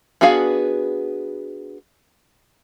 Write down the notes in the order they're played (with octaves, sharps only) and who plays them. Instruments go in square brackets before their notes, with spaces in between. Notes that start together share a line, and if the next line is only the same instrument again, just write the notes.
[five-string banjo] B3 D4 F#4 G#4 F5